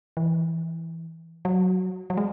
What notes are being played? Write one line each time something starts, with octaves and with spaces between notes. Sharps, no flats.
E3
F#3
F#3
G#3